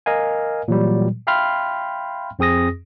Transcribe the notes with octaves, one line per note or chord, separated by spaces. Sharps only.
A#4 D#5 F5 G#5
A#2 E3 F#3 G3
E5 F5 G5 B5 C6 F6
F2 C4 G#4 D#6 A#6